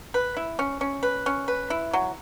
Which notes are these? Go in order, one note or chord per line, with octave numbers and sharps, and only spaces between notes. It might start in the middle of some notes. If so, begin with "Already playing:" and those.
B4
E4
C#4
C#4
B4
C#4
B4
E4
F#3